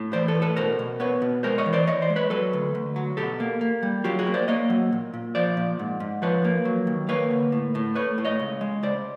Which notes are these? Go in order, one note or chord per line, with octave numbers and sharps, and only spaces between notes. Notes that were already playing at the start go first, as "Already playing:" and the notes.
Already playing: A2
E3 C5 D5
A4 B4
A2
A4 B4
B2 A#4 C5
B2
B3 B4 C#5
B2
G#3 A#4 C5
C#5 D#5
E3
C5 D5
E3 C#5 D#5
C5 D5
G#3
B4 C#5
F#3 A4 B4
D2
D2
F#3
B2 G4 A4
A#3
A#3
G3
F#3 F4 G4
F#4 G#4
A#3
C5 D5
A#3 C#5 D#5
F#3
A#2
A#2
F3 C5 D5
A#2
G#2
G#2
F3 B4 C#5
A#3
F#3
D#2
A#3 B4 C#5
D3
A2
A2
A3 B4 C#5
A2
C#5 D#5
C#2
G#3
C#2 C5 D5